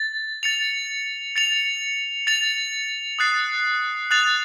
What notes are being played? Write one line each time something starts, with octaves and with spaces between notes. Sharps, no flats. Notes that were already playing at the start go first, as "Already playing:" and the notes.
Already playing: A6
A6 C#7 F7
A6 C#7 F7
A6 C#7 F7
D#6 F#6 A6 C7 F7
D#6 F#6 A6 C7 F7